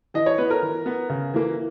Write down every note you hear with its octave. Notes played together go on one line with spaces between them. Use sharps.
E3 D#5
C#5
B3 B4
A#4
E3
B3
C#3
E3 A#3